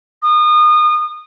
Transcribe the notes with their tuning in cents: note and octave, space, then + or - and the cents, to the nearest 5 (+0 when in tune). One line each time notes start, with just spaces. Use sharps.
D#6 -30